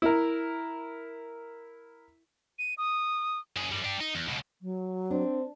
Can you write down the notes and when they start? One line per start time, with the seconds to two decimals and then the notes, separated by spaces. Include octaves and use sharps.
0.02 E4 A#4
2.59 D#7
2.78 D#6
3.56 F#2 G#4
3.72 F#2 G3
3.84 D4 G4
4.00 D#4
4.15 E2
4.28 C#2 B2
4.62 F#3
5.10 C4 D4